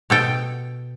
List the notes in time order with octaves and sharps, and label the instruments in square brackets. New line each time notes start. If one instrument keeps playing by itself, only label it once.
[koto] B2 A4 G5